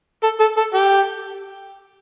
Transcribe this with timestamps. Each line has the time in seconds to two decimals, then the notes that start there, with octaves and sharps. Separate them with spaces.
0.23 A4
0.40 A4
0.57 A4
0.74 G4